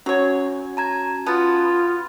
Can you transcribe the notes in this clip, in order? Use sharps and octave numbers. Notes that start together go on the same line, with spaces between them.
F#3 C#4 F#4 C#5
A5 A#5 G#6
B3 F4 A5 A6